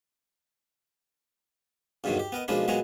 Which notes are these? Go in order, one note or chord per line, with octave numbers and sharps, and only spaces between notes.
E2 G2 B2 D3 D#3 F#3
G4
B3 A#4 D#5
B1 F3 G#3 A#3 D4 B5
A#2 F#3 G#3 B3 C#5 A#5